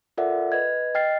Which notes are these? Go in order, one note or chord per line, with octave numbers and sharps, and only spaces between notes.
F4 A4 A#4 D5 E5 F#5
B4 D#5 G#6
D#5 G5 F6 A6 C7